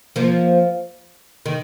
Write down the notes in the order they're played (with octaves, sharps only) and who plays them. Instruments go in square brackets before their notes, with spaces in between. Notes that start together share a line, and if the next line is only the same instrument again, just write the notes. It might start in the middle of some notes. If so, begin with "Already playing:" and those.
[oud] F3 A#3
D#3